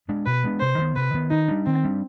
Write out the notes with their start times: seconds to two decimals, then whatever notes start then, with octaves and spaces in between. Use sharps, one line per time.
0.08 G#3 B3 D4
0.26 B2 B4
0.44 G#3 B3 D4
0.61 C3 C5
0.78 D#3 B3
0.96 C3 B4
1.14 D#3 B3
1.31 D#3 D#4
1.48 G3 D4
1.67 D#3 C4
1.84 G3 D4